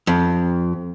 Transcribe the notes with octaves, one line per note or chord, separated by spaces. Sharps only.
F2